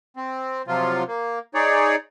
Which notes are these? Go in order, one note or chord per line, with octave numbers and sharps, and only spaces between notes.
C4
C3 F3 F#3 F4
A#3
D#4 G#4 C#5 D5